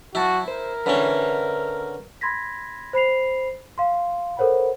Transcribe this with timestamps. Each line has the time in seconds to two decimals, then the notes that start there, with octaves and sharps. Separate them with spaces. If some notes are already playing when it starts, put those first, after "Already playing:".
0.15 F#3 E4 F#4 A5
0.48 A#4 C5
0.86 D3 C#4 B4 C5 E5
2.21 B5 C6 G#6 A#6 B6
2.93 C5 B5 C7 F7
3.78 F5 C6
4.37 A4 A#4 C5 C#5 F#5 B5